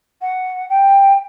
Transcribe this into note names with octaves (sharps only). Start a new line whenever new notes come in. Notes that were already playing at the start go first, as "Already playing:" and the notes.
F#5
G5